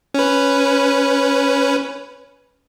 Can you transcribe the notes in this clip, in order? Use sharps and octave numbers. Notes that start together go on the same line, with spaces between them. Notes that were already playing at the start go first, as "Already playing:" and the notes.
C#4 B4